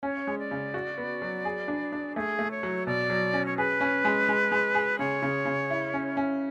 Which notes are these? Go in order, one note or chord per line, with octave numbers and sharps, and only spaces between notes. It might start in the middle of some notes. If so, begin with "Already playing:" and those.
C#4 C#5
G#3
D5
C#3
F#4
B3
F#3
G#4
D4
D4
A3 G#4
A3
C#5
F#3
B2 D5
F#3
C#4
C#5
G#4 B4
C#4
G#3
G#3
G#3
G#4
C#3 C#5
C#3
C#3
E4
C#4
C#4